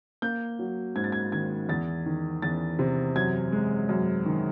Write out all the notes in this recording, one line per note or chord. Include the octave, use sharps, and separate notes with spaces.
A#3 G6
F#3
G#2 G#6
A6
G#6
D#3 G#6
E2 A6
D#3
E2 A6
C3
F#2 G#6
G#3
F#2
D#3